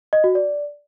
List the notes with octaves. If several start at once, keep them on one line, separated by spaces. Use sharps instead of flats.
D#5
F#4
D5